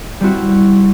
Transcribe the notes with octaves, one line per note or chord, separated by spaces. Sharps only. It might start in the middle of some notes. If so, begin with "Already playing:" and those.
G3 C4 E4 F#4